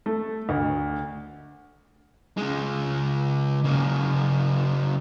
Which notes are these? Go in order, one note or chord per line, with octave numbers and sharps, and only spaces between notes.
A3
D2
C#3 G#3
C#3 A#3